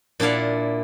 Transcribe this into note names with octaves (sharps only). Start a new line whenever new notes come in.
A#2 D4 E4 F5 F#5